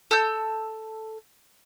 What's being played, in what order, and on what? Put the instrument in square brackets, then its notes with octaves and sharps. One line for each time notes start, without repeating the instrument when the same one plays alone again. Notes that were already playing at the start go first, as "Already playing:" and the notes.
[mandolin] A4 E6 G6